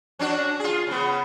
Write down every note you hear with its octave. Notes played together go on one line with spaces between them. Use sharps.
C#4 D4 F#4
F4 G#4
C#3 B3